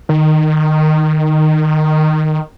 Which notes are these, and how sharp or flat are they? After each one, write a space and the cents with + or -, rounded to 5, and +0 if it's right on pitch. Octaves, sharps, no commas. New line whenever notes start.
D#3 -10